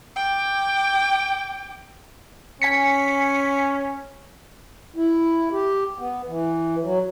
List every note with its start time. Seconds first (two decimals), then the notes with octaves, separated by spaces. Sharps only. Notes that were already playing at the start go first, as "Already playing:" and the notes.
0.16 G5 D6
2.62 C#4 G#5 B6 C#7
4.96 E4
5.52 G4
5.99 B3
6.27 E3
6.83 F#3